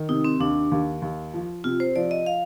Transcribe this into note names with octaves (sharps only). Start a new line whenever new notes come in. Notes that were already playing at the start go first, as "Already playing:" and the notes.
Already playing: D#3
C3 D#4
C4
D#2 D4
D#2
D#2
F3
C3 F4
C5
F3 D5
D#5
F5